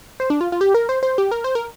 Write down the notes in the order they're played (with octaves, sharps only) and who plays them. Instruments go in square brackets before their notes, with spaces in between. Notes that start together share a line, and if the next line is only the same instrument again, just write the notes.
[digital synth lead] C5
D4
F4
F4
G4
A#4
C5
C5
G4
A#4
C5
A#4